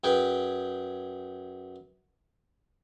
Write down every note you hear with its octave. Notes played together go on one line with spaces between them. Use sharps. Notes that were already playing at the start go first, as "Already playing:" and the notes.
F#2 G#4 B4 G5